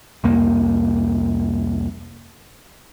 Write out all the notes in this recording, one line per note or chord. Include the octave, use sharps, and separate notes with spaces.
C2 F2 A#3